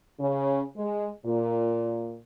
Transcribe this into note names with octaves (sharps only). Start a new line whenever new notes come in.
C#3
G#3
A#2